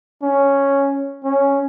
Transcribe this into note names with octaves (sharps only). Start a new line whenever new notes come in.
C#4
C#4